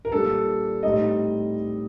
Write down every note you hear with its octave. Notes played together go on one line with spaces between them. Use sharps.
A#4
A#2 G3 D4 A4
A2 G3 C4 D#4 D#5